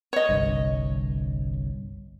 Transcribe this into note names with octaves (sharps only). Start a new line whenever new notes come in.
C#5 D#5
G1 C2 G2